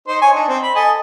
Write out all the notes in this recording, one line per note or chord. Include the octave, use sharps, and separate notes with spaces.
D#4 C5
C#5 G#5
D4 D#4
C4
B5
A4 D#5 G#5